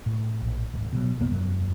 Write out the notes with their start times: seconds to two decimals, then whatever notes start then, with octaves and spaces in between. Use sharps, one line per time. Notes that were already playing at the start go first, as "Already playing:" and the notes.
0.06 A2
0.42 A#1
0.73 D1 G#1
0.93 B2 E3 F#3
1.20 C2 F#2 A#3 B3
1.32 E1 F#2 F#3